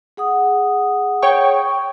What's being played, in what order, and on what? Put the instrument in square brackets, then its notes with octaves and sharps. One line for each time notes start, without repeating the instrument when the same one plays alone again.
[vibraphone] G#4 F#5 D#6
[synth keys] C#5 G5 C#6